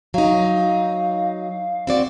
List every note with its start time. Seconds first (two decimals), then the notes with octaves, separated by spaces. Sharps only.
0.14 F#3 D#4 F5
1.87 C4 F#4 D5